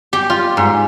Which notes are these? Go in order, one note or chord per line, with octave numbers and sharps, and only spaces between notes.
G4
F4
G#2